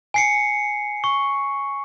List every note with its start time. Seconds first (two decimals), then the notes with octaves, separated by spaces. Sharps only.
0.14 G#5 C7 C#7
1.04 C#6